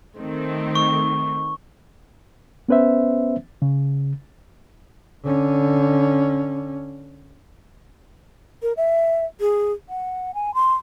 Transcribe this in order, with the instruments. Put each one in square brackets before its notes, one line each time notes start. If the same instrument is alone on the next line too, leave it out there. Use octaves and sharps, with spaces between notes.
[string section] D#3 A3 C4
[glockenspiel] C#6
[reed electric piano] B3 C#4 B4 C5 E5
C#3
[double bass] D3 C#4
[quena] A#4
E5
G#4
F#5
G#5
C6